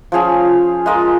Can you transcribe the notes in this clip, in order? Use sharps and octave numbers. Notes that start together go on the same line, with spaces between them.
F3 C#4 G#4 F5
G#3 F4 A#4 D#5